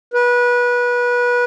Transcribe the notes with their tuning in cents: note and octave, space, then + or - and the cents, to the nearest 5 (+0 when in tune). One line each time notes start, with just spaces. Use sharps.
B4 -25